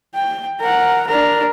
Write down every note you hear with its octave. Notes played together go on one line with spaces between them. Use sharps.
G5
A#4 F#5
D4 A#4